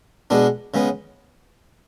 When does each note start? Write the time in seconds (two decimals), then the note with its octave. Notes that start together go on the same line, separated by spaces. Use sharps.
0.30 B2 G#3 B3 D4
0.74 C#3 G#3 B3